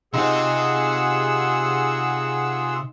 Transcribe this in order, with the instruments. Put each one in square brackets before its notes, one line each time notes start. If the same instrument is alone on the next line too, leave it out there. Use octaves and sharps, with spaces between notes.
[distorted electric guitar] C3 C5 [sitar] D#4 [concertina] F4 [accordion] G#4 F#5 E6